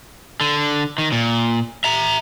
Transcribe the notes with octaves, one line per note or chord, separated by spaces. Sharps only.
D3
D#3
A#2
E5 A#5